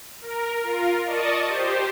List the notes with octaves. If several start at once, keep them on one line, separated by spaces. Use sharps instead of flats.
A#4
F4 A#4
D5 D#5 A5 C#6 D#6
G4 C5